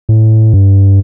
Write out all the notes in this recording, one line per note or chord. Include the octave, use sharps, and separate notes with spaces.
A2
G2